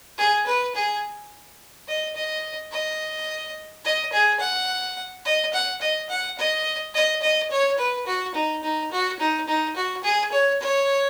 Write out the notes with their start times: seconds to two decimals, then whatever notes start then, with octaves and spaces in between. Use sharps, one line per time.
0.18 G#4
0.46 B4
0.75 G#4
1.88 D#5
2.16 D#5
2.72 D#5
3.85 D#5
4.13 G#4
4.40 F#5
5.25 D#5
5.53 F#5
5.81 D#5
6.09 F#5
6.38 D#5
6.94 D#5
7.22 D#5
7.51 C#5
7.78 B4
8.06 F#4
8.35 D#4
8.63 D#4
8.92 F#4
9.19 D#4
9.47 D#4
9.76 F#4
10.04 G#4
10.32 C#5
10.60 C#5